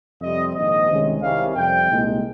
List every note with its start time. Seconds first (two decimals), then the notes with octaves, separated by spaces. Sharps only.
0.21 F2 C3 G3 C4 D#5
0.55 A#1 G#2 D#3 D#5
0.89 C2 C3 D#3 G#3 C#4
1.22 C2 C3 D#3 G3 C#4 F5
1.55 F2 C3 G3 G5
1.89 C2 A#2 G#3 D#4